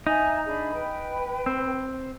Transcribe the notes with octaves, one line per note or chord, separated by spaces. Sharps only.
D#4 E5 G#5 A#5
D4 G#4 B5
B4 G5
C4